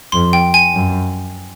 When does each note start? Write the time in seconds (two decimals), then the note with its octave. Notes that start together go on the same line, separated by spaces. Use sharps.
0.12 F2 C6
0.33 G5
0.54 G#5
0.74 F#2